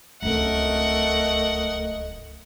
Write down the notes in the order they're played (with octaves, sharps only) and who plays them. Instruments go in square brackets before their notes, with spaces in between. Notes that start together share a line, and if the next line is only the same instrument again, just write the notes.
[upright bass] D1 C#2 [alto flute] A3 [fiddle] A#4 F#5 [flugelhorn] D#5